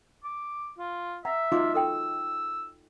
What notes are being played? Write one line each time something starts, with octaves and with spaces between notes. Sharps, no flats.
D6
F4
E5 F#5 A#5
D#4 F4 F#4 D6
A4 D#5 G5 E6